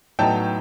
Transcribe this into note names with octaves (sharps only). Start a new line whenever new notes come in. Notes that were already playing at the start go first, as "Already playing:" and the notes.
A2 F#3 B3 D#4 G5 A5